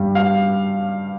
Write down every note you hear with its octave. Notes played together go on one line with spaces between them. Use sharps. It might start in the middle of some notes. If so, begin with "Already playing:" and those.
Already playing: G2 G3
F5